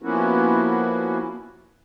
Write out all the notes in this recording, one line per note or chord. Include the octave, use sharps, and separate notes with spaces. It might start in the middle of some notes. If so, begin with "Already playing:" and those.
F3 A#3 B3 C#4 E4 F#4